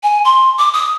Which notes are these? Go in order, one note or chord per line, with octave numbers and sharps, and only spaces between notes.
G#5
C6
D6
D#6